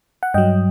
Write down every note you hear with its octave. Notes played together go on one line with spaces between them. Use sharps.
F#5
G2 F#3 D#5 G5